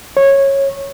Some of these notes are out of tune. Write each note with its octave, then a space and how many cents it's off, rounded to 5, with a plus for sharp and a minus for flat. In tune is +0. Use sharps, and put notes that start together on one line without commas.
C#5 -15